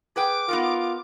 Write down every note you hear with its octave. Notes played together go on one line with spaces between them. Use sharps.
G#4 B4 G5 D6
B3 D#4 F4 A#4